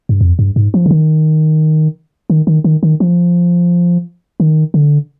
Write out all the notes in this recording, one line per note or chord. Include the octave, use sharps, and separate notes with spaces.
G2
F2
G2
G#2
F3
D3
D#3
D#3
D#3
D#3
D#3
F3
D#3
D3